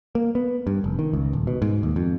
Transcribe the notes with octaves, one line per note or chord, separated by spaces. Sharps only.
A#3
B3
G2
F1
D#3
C#2
D#1
B2
G#2
D#2
F2